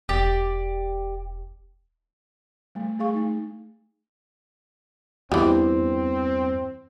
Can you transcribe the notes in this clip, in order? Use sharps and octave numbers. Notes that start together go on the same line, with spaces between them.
E1 G4 D5
G3 A3
A3 G#4 F5 C#6
A3 D#4
E2 G2 E3 G3 C4